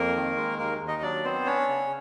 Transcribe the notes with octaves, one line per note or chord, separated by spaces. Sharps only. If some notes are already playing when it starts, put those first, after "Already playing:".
Already playing: F2 A#3 A#4
D#3
G#3
D#2 A#3 A#4
D#2
D#4 D#5
F#3 D4 D5
B3 C4 C5
C#4 D4 C#5
C#3